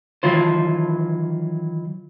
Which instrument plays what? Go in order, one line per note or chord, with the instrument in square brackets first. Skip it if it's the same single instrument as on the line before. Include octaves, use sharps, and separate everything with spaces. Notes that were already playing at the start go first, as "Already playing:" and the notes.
[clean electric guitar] D#3 E3 F#3 F4 C5